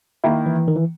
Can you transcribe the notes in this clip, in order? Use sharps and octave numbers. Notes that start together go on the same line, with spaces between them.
D#3 A#3 E4
E3
D#3
E3